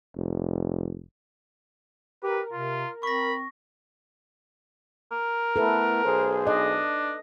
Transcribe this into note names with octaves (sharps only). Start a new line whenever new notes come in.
F1
G4 A#4 B4
C3 F4
C4 B5 C#6 A#6
A#4
A3 B3 E4 A4 B4
B1 G#4 C5
D4 D#5